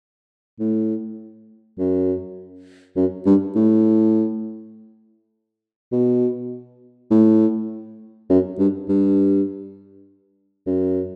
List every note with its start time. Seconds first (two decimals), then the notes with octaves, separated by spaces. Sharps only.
0.59 A2
1.78 F#2
2.96 F#2
3.26 G2
3.55 A2
5.92 B2
7.11 A2
8.30 F#2
8.58 G2
8.89 G2
10.66 F#2